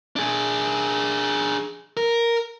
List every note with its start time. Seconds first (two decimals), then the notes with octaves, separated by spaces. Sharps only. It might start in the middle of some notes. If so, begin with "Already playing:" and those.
0.16 D4 G#4
1.97 A#4